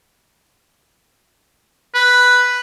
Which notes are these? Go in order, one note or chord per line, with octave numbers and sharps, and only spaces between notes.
B4